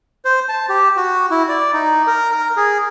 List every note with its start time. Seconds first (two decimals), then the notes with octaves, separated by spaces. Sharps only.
0.25 C5
0.49 A5
0.69 G4
0.97 F#4
1.31 E4
1.49 D5
1.73 D#4
2.07 A#4
2.32 A#4
2.57 G#4